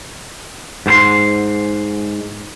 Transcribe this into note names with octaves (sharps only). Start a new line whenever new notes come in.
G#2 C5 C6